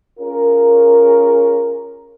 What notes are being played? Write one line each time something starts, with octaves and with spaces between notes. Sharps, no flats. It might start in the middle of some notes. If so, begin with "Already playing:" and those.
C#4 F4 G#4 A#4